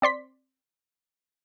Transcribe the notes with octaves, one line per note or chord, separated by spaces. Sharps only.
C4 D5 C6 B6